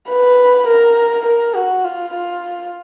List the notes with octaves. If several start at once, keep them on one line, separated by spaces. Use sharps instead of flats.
B4
A#4
A#4
F#4
F4
F4